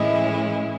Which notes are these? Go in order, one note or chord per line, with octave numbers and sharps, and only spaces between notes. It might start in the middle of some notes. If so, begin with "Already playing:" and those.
Already playing: A2 E3 G#3 C#4 E4 D#5 E5